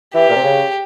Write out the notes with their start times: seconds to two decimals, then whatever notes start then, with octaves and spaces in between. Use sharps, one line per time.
0.14 E3 G4
0.29 A#2
0.36 C3
0.43 C#3